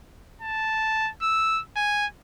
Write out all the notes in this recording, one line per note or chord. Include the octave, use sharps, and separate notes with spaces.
A5
E6
G#5